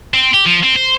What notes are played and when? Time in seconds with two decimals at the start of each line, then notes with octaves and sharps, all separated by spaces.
0.14 C4
0.34 G4
0.46 F3
0.63 C4
0.76 C5